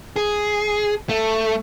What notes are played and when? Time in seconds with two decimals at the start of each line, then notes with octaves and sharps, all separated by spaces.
0.16 G#4
1.09 A3